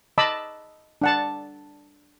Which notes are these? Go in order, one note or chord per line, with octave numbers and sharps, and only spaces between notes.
D#5 A5 B5 D6 E6
D4 F#5 A5